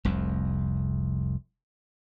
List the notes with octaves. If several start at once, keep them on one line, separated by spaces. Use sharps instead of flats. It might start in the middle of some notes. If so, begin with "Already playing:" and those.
F1 C2 F2